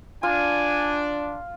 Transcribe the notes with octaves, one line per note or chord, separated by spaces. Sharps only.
D4 F4 G#5